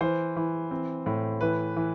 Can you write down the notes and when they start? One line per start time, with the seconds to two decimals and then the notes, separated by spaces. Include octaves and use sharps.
0.01 E3 C5
0.36 E3
0.71 C4
1.06 A2
1.41 E3 B4
1.76 E3